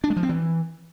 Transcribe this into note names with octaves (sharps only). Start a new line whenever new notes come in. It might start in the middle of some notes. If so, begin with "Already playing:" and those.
D4
G#3
F3
C4
E3